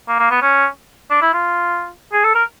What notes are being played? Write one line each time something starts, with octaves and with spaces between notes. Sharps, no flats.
A#3
A#3
B3
C#4
D4
E4
F4
G#4
A4
A#4